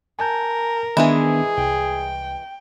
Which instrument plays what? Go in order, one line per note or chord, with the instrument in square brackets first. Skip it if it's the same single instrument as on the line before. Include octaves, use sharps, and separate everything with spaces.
[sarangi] A#4 [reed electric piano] G#5 A5 G6
[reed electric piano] D#3 B3 D4 [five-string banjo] E3 G#3 E4 [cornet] G#4
[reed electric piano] C2 [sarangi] G5